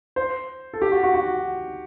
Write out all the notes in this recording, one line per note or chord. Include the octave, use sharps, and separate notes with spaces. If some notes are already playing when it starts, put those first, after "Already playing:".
C5
A4
G4
F#4
F#4
F#4